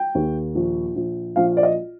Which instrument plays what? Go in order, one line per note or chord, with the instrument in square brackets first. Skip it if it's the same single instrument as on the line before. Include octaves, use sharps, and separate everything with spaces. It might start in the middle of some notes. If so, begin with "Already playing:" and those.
Already playing: [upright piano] G5
D#2
A#1
A#1
A#1 F5
D5
D#5